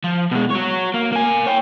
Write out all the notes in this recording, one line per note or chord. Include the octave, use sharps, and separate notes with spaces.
F3
B2 G#3
F#4 C#5
A#3
A#3 G#5
C#5 G5